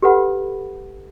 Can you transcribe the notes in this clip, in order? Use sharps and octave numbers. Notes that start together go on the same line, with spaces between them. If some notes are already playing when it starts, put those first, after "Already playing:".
G4 A4 B4 F#5 B5